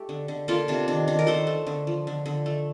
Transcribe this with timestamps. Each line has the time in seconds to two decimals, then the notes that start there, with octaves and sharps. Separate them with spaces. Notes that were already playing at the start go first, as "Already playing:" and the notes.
Already playing: A3 G4
0.09 D3
0.28 D3
0.48 A#3 F4 A4
0.68 C3 D4
0.88 D#3 D4
1.07 D#3 D4
1.19 A#4
1.27 A3 A4 C5
1.47 A3
1.67 D3
1.87 F3
2.07 D3
2.26 D3
2.46 A3